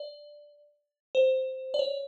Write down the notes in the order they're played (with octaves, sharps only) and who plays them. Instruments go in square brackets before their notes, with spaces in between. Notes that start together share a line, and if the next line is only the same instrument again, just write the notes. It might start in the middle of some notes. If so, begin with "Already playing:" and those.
Already playing: [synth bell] D5
C5
D5
C#5